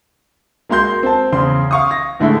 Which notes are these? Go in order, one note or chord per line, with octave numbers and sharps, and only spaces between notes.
G#3 A#3 F#4 C6 G6
C4 A5
E2 C#3 C6
F5 C#6 D#6
A#6
A2 D3 G#3 A3 E4